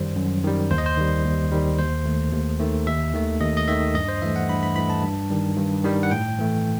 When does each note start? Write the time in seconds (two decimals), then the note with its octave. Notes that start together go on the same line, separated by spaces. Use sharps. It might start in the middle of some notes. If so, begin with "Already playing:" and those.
Already playing: F#2 D#3 G3 C5
0.16 F#2
0.43 D#3 G3
0.71 D#2 C5
0.78 D#5
0.86 C5
0.97 D#3 G3
1.24 D#2
1.52 D#3 G3
1.79 D#2 C5
2.06 D#3 A3
2.32 D#2
2.60 D#3 A3
2.87 D#2 E5
3.14 D#3 A3
3.41 D#2 D#5
3.57 D#5
3.68 D#3 A3 E5
3.95 G2 D#5
4.08 C5
4.22 E3 A3 E5
4.36 F#5
4.49 G2 B5
4.63 B5
4.76 E3 A3 B5
4.90 A5
5.03 G2
5.30 D#3 G3
5.57 G2
5.84 D#3 G3
6.03 F#5
6.11 A2 G5
6.39 E3 A3